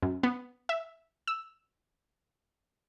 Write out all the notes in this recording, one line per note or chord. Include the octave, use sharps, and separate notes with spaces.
F#2
B3
E5
E6